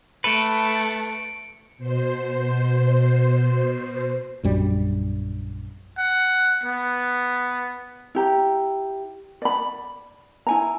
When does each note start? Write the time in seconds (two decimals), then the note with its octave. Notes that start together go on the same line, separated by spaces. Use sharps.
0.24 A3 A4 B4 C#7 D7
1.78 B2 C5
4.43 A#1 F#2 G3
5.98 F#5
6.64 B3
8.15 E4 G4 A#5
9.42 D5 B5
10.47 E4 G#5 A#5